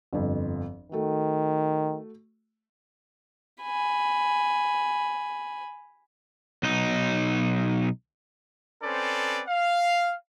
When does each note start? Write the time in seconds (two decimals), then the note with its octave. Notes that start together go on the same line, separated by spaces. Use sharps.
0.13 G1 F2
0.92 D#3 A3 F#4
3.63 G#5 B5
6.63 B1 D#4
8.83 C4 C#4 A4 B4 C5 D5
9.48 F5